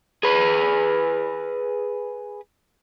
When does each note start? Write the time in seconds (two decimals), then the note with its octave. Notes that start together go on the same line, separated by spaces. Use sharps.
0.23 G#4 B4